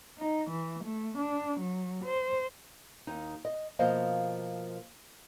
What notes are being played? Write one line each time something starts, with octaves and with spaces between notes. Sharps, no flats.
D#4
E3
A3
D4
F#3
C5
D#2 D#4
D#5
B2 F3 A#3 C5 D#5 F5